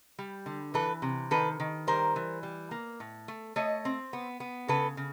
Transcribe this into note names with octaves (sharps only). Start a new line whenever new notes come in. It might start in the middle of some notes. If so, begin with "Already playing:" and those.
G3
D3
E3 A4 B4
C3
D#3 A4 B4
D#3
G3 A#4 C5
E3
G3
A#3
A2
A3
A3 C#5 D#5
C4
B3
B3
C#3 A4 B4
C#3